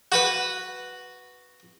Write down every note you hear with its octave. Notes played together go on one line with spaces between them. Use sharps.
F#4 B4 F#5